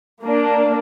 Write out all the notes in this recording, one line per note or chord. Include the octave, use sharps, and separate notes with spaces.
A#3 D4